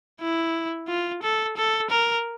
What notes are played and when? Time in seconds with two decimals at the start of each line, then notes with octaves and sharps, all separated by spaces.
0.21 E4
0.88 F4
1.23 A4
1.57 A4
1.90 A#4